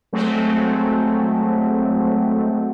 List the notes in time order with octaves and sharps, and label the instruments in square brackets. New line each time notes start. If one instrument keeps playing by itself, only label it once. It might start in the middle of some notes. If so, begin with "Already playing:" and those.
[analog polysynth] F#3 G#3 A3 C4